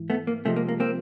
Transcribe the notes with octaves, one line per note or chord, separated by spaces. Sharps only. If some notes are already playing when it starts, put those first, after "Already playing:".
Already playing: G#2 E3
A3 B3
A#3
C3 F3 G#3 A3
A#3
A#3
A#3 C4